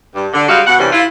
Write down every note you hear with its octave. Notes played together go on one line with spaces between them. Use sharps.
G2
D3
G3 G#3 F#4 F5
B2 F#5
G2 C3 E3 G3 C#4
E4 F4